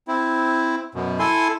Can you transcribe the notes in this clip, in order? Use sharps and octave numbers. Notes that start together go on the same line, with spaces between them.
C4 E4
F#2 B2
E4 A4 G#5 C6